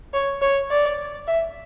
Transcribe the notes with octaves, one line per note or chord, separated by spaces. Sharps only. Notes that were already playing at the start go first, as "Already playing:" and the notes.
C#5
C#5
D5
E5